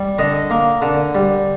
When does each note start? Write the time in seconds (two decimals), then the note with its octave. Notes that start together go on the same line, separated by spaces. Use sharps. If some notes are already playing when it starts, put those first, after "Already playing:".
Already playing: G3
0.18 D3 D#5
0.50 A#3
0.82 D3
1.15 G3